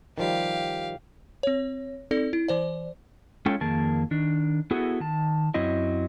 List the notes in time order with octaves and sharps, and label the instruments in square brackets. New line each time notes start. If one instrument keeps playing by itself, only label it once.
[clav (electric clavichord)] D#3 F3 G3 [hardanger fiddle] G4 F5
[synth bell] C4 C#5
C4 D#4 A4 D5
E4
E3 C5 D5
[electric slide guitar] G#3 C#4 F4 A4 C#5 G5
F2 D#3 A#3 G#4 A#4 A5
D#3 D4
B3 E4 F#4 G#4 A4
D#3 A5
F#2 F#3 C4 E4 D#5